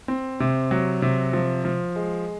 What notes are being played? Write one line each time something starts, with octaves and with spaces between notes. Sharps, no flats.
C4
C3
F#3
C3
F3
F3
G#3